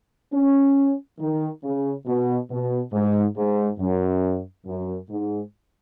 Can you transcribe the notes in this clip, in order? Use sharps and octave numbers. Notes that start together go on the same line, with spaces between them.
C#4
D#3
C#3
B2
B2
G#2
G#2
F#2
F#2
G#2